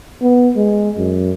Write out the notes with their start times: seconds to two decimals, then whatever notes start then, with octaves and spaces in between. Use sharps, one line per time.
0.22 B3
0.56 G#3
0.97 F#2